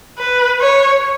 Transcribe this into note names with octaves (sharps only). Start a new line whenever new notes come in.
B4
C#5